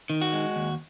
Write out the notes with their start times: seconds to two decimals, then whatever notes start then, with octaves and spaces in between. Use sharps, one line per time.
0.10 D#3
0.21 F#4
0.33 G#3
0.56 D#2